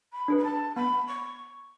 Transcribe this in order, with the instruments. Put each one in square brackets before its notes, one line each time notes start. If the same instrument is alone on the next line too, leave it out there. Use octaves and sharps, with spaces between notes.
[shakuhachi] B5
[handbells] D4 G#4 B4
[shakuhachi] B5
A5
[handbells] B3 [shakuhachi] B5
[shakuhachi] C#6